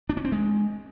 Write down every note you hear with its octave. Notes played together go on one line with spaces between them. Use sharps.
D4
C#4
C4
G#3